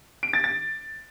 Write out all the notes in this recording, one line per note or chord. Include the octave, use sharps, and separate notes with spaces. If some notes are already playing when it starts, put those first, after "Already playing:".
D7
A6
A6